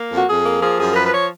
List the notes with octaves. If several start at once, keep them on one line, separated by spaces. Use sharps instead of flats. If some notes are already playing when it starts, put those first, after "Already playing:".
Already playing: A#3
F2
F#4
F2 G#4
A#3
F3 G#4
F#2 G#4
A#4
F3 B4
B4
C#5